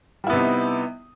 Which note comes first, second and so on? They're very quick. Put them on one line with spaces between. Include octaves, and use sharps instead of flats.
G3 E4 B3 C3 D#4